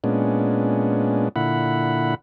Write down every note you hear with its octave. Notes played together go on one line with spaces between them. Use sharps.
A#2 G#3 B3 C#4 D4
A#2 D3 E4 F#5 B5